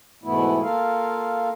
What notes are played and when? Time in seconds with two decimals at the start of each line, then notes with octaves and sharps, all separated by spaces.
0.23 G#2 B2 E3 A3 B3 E4
0.62 A#3 F4 A4 A#4 F5